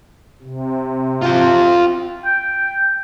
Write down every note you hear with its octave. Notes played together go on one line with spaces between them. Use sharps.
C3
F4 G5
G5